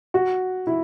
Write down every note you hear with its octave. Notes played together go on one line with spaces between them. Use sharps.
F#4
E4